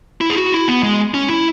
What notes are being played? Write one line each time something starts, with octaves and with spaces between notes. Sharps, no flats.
E4
G#4
F#4
E4
B3
G#3
C#4
E4